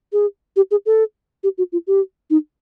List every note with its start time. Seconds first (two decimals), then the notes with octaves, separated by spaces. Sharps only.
0.13 G#4
0.56 G4
0.71 G#4
0.86 A4
1.43 G4
1.58 F#4
1.72 F4
1.87 G4
2.30 D#4